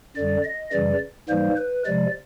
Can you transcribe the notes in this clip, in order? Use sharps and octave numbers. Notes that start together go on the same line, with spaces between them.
F#2 D3 G3 D5
D#5
F#2 C#3 E3 G3 D5
G#2 E3 G3 A#3 C5
B4
C3 F3 G#3 D5